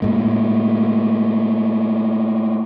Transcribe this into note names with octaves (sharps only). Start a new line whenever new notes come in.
A2 G#3 A#3